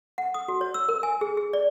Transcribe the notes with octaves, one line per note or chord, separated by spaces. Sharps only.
F#5
D#6
F#4
C#5
E6
A#4
G#5
G#4
G#4
D5